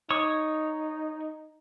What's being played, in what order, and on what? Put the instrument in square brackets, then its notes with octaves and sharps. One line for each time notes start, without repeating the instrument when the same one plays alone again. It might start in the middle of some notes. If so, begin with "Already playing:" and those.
[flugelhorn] D#4 [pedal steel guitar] C#5 C#6 D#6